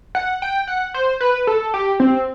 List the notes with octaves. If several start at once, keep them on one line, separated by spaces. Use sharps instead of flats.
F#5
G5
F#5
C5
B4
A4
G4
C4